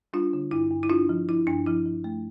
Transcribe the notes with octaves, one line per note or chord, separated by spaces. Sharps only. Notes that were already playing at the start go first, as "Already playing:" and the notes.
G3 D4 F4
D3
G2 E4
G2
E4
G2 D4 F4
F3
F3 E4
G2 D4
F3 E4
F3
A3